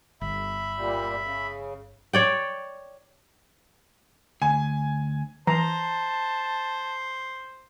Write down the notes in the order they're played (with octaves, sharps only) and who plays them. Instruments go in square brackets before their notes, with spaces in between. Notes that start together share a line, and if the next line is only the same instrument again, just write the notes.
[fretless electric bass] G1 [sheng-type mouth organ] E5 B5
[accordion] A#2 G3
C#3
[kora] C#5 D5 G5
[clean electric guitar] D2 [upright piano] G#5
[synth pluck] E3 [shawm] C5 [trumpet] A5 [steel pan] A#5